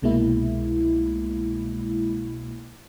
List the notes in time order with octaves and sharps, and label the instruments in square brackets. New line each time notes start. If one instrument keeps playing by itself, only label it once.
[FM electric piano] C2 B2 G#3 A#3 E4